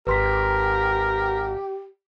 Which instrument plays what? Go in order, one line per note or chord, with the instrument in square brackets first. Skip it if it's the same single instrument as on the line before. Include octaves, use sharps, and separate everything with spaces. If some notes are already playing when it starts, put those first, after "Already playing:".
[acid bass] G#1 [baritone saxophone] G4 [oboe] A#4 [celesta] B4 C6 B6